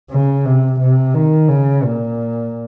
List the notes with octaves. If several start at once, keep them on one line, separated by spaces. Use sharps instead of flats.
C#3
C3
C3
D#3
C#3
A#2